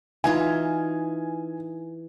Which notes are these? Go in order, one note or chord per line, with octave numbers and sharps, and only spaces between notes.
E3 D#4 F4 G#5